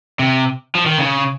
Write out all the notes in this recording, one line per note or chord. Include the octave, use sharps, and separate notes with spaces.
C3
F3
D#3
C#3